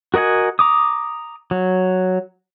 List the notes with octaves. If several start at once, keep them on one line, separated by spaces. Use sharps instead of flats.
F#4 A#4 D#5 F#5 G#5
A#5 D6 D#6
F#3